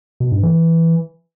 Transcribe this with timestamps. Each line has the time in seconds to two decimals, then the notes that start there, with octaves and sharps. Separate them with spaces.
0.20 B2
0.32 G2
0.43 E3